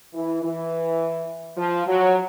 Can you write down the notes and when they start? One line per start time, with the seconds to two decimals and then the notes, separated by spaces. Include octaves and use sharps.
0.14 E3
0.43 E3
1.57 F3
1.87 F#3